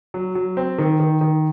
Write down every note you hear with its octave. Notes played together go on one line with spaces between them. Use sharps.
F#3
F#3
C4
D#3
D#3
D#3